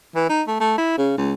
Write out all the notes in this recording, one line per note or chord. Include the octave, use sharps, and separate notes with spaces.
E3
D#4
A3
A3
E4
C#3
C#2